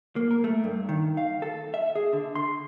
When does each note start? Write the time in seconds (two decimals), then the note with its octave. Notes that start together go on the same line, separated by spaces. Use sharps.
0.16 A#3
0.31 A#4
0.44 A3
0.64 G2
0.89 D#3
1.17 F5
1.42 A4
1.74 E5
1.95 G#4
2.13 D3
2.35 C6